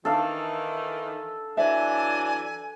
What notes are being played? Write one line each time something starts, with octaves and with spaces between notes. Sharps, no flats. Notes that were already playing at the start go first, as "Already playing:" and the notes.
D#3 E3 D4 A4 F5
E3 F#3 D4 C5 E5 G#5